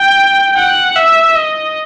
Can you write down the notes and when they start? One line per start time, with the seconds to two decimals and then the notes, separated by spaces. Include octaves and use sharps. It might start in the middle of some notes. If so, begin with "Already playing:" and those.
Already playing: G5
0.58 F#5
0.96 E5
1.36 D#5